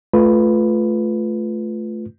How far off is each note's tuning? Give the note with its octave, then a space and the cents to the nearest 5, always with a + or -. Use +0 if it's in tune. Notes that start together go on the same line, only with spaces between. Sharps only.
A3 -15 F4 +0 B4 +0